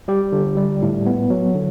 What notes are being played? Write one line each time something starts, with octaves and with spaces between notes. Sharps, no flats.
G3 G4
D3
G3
A2
B3
F#3
D3